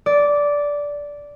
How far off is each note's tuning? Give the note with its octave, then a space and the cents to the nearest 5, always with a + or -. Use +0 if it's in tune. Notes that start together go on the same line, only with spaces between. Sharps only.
D5 -10